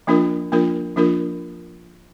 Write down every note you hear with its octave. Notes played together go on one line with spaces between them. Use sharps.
F3 A#3 D4 F4 A#4
F3 A#3 D4 F4 A#4
F3 A#3 D4 F4 A#4